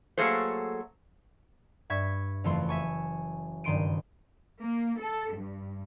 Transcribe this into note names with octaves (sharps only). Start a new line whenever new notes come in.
F#3 A3 A#3 G#4 A4 C5
G2 E5 C#6 G#6 B6
F#1 F2 E3 A3 C6
E5 G#5 C#6
F#1 G2 D#3 C6 D7 D#7
A#3
A4
G2